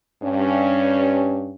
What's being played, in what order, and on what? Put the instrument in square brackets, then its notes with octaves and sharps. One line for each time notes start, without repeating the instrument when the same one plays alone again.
[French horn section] G2 C#4